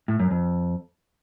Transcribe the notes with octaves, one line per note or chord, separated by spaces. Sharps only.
A2
F#2
F2